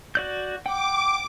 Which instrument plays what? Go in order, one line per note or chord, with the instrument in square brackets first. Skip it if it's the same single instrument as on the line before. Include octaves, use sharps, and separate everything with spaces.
[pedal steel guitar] F#4 D5 G6
[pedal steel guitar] F#5 G5 [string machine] D6